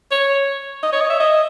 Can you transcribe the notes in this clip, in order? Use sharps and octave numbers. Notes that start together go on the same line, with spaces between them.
C#5
D#5
C#5
D#5
E5
D#5